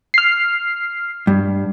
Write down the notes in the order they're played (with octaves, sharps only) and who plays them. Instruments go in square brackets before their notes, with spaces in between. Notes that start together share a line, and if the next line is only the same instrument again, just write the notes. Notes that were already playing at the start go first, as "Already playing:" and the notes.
[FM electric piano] F6 C7
[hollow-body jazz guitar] G2